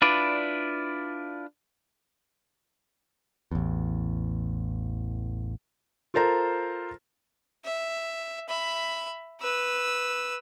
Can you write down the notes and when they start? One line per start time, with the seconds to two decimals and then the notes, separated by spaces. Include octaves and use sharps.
0.02 D4 E4 F4 B4 D5
3.52 A1 E2
6.14 F4 A4 A#4 C5 A#5
7.65 E5
8.49 E5 B5
9.41 B4 E6